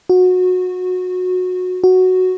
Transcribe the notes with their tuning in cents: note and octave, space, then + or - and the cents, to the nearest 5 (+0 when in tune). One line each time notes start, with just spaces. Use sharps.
F#4 -20
F#4 +0